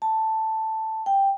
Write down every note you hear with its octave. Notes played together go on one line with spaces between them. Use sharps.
A5
G5